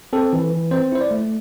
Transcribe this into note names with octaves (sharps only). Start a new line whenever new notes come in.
C4 A4
E3
E3
C4 C5
E4 C5
D5
A3